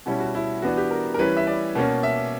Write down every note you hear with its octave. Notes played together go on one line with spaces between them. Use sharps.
B2 G3 C#4 E4
F#4
E4
E3 B3 D4 F#4
G4
A#4
A#4
E3 G3 C#4 B4
E5
D5
B2 A#3 C#4
E5